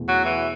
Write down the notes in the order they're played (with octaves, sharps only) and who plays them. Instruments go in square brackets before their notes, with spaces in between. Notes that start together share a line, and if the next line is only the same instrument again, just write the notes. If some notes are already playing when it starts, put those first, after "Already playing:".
Already playing: [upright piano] E2 B2 A3
[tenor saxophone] F#3
E3